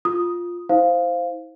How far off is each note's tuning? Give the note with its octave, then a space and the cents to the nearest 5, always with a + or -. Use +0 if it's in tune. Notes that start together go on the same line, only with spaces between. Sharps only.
F4 +5 D#6 +0
E4 -45 C5 +0 F5 +0